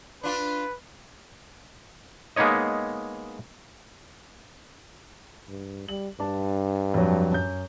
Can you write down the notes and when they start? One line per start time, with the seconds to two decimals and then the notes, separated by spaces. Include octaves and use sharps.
0.23 D4 F4 B4
2.36 G#3 A#3 B3 D#4 C#5 D#5
5.49 G2
5.88 G3 F#7
6.20 G2 D4 A5
6.94 F2 F#3
7.32 F#2 G6